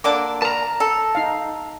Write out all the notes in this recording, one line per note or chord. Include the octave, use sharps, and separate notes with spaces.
D3 A#3 D4 D6
A#4 A5 A#5
A4
D#4 F5